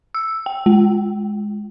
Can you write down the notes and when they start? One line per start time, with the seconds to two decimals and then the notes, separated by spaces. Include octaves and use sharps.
0.14 E6
0.46 G5
0.66 G#3